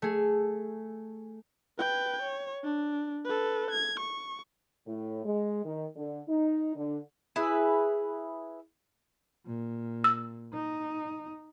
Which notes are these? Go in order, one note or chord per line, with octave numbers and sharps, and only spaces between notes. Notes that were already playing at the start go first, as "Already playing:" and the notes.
A3 G#4
B4 G5
C#5
D4
A4 B4
G#6
C#6
A2
G#3
D#3
D3
D#4
D3
E4 G#4 B4
A#2
E6
D#4